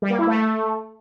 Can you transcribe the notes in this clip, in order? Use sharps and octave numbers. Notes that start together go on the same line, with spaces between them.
G3
A#3
E4
A3